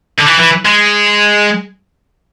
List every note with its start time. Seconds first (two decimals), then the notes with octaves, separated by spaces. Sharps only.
0.19 D3
0.26 E3
0.40 E3
0.66 G#3